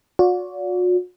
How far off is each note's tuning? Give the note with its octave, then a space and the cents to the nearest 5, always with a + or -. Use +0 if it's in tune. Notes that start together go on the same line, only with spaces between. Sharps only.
F#4 -45 D5 -35